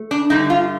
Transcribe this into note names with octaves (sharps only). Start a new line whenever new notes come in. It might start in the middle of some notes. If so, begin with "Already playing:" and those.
Already playing: A3
D4
G2 D3 A3 D#4
F4